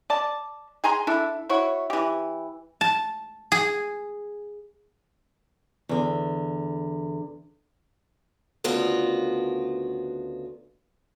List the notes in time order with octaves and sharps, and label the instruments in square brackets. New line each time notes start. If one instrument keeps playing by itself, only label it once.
[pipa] D5 A5
G#4 G#5 A#5 C6
D4 E4 A4
E4 F#4 C#5
E3 G4
[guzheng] A5
G#4
[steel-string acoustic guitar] E2 D3
D2 C#3 B3 F4 F#4 A#4